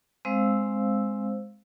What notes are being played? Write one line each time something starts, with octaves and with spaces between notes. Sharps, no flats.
G#3 C4 C5 F5 E6